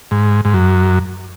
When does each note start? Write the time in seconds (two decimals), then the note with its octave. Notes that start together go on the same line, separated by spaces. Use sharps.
0.11 G#2
0.45 G#2
0.54 F#2